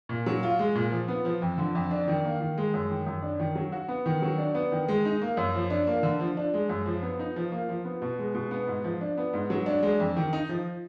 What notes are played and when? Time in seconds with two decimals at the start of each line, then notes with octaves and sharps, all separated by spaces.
0.09 A#2
0.26 F#3
0.43 F4
0.59 G#3
0.75 A#2
0.91 F3
1.08 B3
1.25 F3
1.42 F2
1.58 D3
1.75 F2
1.91 D4
2.08 D#3
2.24 A#3
2.41 D#3
2.58 G#3
2.74 F#2
2.90 D#3
3.06 F#2
3.22 D4
3.39 D#3
3.55 F#3
3.72 F#4
3.88 B3
4.06 D#3
4.22 F#3
4.38 D4
4.55 B3
4.72 D#3
4.88 G#3
5.05 D#4
5.22 A#3
5.37 F#2
5.55 F3
5.70 D4
5.87 A#3
6.03 D3
6.20 F3
6.37 D4
6.54 G#3
6.69 F#2
6.86 F3
7.02 B3
7.19 D#4
7.36 F3
7.52 A#3
7.69 F3
7.85 B3
8.02 B2
8.19 G#3
8.35 B2
8.51 B3
8.68 G#2
8.84 F3
9.01 D4
9.17 B3
9.33 G#2
9.50 F#3
9.66 D4
9.83 G#3
10.00 F2
10.17 D#3
10.33 D#4
10.49 F3